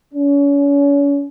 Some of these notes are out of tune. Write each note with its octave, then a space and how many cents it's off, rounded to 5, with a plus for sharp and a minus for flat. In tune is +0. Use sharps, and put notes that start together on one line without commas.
C#4 +35